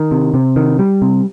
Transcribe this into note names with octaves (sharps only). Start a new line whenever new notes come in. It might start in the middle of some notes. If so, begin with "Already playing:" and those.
Already playing: D#3
C3
C3
D#3
G3
C3